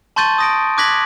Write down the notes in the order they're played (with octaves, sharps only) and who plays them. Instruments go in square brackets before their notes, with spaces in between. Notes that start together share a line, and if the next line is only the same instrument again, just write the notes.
[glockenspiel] A5 C6 C#6 G6 A6 D#7
D#6 A#6 D7
D6 F#6 G#6 A#6 B6 F#7